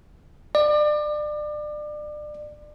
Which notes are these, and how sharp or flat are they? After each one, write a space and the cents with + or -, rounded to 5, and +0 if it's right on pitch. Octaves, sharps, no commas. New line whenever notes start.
D5 +30